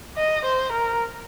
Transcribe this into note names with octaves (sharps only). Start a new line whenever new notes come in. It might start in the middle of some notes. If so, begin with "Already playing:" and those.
D#5
C5
A#4